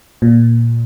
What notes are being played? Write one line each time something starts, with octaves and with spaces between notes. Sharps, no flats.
A#2